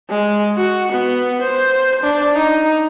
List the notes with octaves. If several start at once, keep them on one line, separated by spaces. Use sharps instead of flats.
G#3
F#4
B3
C5
D4
D#4